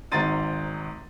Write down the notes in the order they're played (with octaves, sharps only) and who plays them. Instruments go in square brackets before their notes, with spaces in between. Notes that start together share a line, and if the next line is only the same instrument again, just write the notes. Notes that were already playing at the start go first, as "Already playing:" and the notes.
[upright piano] G#1 G#2 A#5 C6 A6 D#7